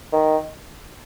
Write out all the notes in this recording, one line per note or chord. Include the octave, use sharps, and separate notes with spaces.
D#3